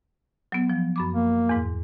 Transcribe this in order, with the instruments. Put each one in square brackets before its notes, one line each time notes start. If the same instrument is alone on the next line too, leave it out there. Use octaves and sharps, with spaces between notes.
[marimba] F#3 B3
F3
F#2 B5 D6
[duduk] A#3
[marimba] E2 G#2